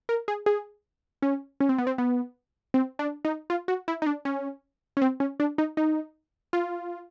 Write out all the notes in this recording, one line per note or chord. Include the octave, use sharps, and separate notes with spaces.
A#4
G#4
G#4
C#4
C#4
C4
B3
C4
B3
C4
D4
D#4
F4
F#4
E4
D#4
D4
C#4
C#4
C4
C#4
D4
D#4
D#4
F4